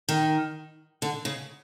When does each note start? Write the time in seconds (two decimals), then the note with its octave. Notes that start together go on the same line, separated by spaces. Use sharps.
0.09 D#3
1.02 D3
1.25 C#3